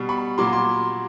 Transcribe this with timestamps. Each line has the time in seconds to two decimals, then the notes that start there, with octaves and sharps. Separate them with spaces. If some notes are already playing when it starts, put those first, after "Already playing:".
Already playing: B2 G3
0.09 B5 C#6
0.38 A#2 F#3 C6 D6
0.52 C6 D6